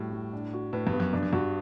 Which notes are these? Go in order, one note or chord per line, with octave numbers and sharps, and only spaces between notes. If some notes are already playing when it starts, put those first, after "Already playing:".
Already playing: A2 G3 F#4
G3
D4
F#4
A2 B4
G2
B3
F#2
G2 D4
F#2
G2 F#4